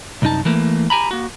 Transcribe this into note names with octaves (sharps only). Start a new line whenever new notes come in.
C2 F#2 D#4 A5
E3 A3 A#3
G4 G#5 A#5 B5
A#3 F#4